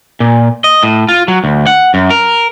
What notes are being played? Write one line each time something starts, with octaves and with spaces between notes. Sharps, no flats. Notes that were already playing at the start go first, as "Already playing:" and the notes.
A#2
D#5
A2
F4
F#3
D2
F#5
F#2
A#4